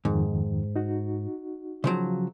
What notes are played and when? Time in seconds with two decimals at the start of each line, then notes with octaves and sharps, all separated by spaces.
0.05 F2 G#2 D#3
0.76 D#4 F#4
1.84 C#3 F3 F#3